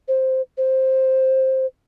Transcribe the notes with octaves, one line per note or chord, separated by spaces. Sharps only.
C5
C5